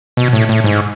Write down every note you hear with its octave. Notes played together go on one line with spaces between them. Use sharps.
B2
A2
A2
G#2